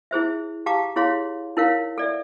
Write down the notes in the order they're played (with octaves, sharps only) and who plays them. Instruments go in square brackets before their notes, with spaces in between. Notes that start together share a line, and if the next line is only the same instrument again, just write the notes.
[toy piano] E4 G#4 C5 E5
G4 F5 A5 A#5 D6
E4 G#4 C#5 F5 C6
D#4 E4 A#4 C#5 F5
A4 D5 E5